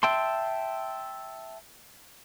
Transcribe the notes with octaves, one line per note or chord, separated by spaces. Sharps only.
E5 G5 A5 C6